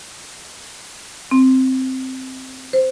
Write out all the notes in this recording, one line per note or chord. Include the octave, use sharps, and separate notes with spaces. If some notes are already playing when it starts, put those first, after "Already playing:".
C4
C5